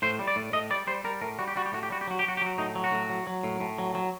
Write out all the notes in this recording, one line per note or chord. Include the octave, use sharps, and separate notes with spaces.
A2 C5
G3
D5
A2
A2 D#5
G3 D5
G3 C5
G3 A#4
A2 A#4
G3 F#4
G4
G3 F#4
G4
A2 F#4
G4
G3 F#4
G4
F#3 F#4
G4
F#3 F#4
G4
F#3 F#4
A2 D#4
F#3
F#4
A2
F#3
F#3
A2
A2
F#3
F#3